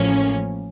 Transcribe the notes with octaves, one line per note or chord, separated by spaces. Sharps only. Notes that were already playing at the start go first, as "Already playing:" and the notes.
Already playing: A1 A2 F3 A#3 C#4